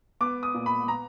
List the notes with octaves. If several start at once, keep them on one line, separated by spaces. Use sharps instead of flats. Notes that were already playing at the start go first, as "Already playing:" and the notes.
B3 D6
D#6
A#2
B5
B3 A#5